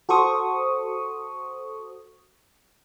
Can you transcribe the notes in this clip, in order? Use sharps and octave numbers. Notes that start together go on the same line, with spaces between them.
F#4 A4 C5 C#6 D#6